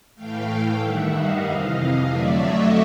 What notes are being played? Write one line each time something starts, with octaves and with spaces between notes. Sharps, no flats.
A2 E3 A3 F5 G5
F5 G5
G2 D#3 G3 E5 F#5
D#5 F5
F2 C3 E3
F2 D3 F#3 A3 D5 E5
C#5 D#5